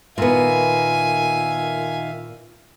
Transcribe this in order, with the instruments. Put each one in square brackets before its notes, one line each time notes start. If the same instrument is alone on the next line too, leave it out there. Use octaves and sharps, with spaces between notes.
[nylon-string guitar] A#2 B3 [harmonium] D#3 E5 F5 [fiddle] G#5